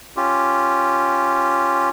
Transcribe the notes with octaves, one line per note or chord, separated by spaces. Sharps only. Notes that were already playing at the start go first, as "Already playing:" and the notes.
C#4 F4 G4